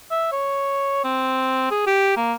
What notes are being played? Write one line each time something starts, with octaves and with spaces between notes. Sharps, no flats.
E5
C#5
C4
G#4
G4
A#3